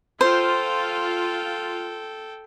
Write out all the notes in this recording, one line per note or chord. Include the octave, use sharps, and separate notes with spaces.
F4 A4 C5 G5